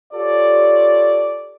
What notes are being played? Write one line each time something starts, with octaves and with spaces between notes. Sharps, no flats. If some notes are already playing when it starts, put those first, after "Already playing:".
F4 G4 A4 C#5 D5